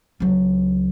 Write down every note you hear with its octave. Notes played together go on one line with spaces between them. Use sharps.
C#2 F#3